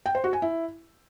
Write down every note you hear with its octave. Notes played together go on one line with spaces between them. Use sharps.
G5
C5
F#4
G#5
E4